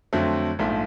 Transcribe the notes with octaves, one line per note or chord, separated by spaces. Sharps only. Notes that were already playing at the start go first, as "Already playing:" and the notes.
F2 D3 F#3 A3 C4
A#1 G#2 F3 A3